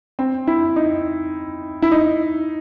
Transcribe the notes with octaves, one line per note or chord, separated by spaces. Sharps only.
C4
E4
D#4
E4
D#4